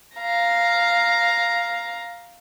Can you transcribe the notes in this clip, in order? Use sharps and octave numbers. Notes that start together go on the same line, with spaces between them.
F5 A#5